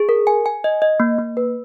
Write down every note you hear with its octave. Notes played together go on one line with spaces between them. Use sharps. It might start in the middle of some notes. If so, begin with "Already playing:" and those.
Already playing: G#4
A#4
G#5
G#5
D#5
D#5
A#3
A#3
B4